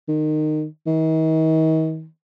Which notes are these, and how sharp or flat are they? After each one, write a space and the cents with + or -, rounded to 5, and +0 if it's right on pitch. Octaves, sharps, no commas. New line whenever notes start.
D#3 -20
D#3 +40